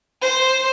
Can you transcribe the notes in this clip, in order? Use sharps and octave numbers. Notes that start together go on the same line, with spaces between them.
C5